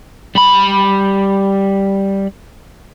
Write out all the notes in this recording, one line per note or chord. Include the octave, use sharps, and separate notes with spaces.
G3 B5